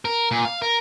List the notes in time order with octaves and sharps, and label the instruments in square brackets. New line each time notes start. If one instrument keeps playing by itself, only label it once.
[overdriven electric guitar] A#4
A#2
F5
A#4